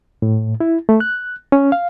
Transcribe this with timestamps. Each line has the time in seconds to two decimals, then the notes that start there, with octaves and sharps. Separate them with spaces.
0.22 A2
0.60 E4
0.89 A3
1.00 F#6
1.52 C#4
1.72 F5